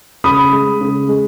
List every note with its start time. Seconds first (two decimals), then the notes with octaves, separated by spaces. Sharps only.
0.24 C#3 B5 D#6
0.52 G#3
0.81 C#3
1.09 G#3